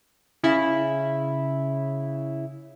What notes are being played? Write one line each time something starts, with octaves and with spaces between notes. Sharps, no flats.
C#3 E4